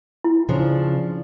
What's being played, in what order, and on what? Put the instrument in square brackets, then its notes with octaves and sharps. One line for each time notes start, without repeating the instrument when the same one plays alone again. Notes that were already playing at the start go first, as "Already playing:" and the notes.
[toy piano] E4
[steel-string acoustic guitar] C#3 F3 D4